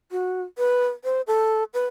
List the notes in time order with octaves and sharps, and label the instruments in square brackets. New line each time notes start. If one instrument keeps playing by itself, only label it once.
[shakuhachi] F#4
B4
C5
A4
B4